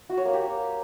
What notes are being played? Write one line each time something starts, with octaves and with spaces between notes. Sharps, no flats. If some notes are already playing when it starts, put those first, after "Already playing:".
F#4
C#5
A#3
G4